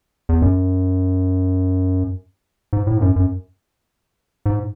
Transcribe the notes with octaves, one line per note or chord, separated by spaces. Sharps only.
E2
F#2
G#2
A2
G#2
F#2
F#2
G#2